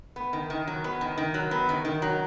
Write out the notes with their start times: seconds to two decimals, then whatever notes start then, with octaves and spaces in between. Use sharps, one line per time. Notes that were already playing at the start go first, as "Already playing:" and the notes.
0.16 B3
0.33 D#3
0.50 D#3
0.68 F#3
0.84 B3
1.01 D#3
1.18 D#3
1.34 F#3
1.51 B3
1.69 D#3
1.85 D#3
2.02 F#3